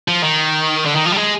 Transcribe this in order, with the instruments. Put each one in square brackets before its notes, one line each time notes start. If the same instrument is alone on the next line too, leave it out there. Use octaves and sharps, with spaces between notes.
[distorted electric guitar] F3
D#3
D3
D#3
F3
G3
G#3